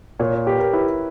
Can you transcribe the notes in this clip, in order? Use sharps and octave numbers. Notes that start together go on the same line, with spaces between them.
A#2 C#5
C#5
G4 B4
A#4
E4 B4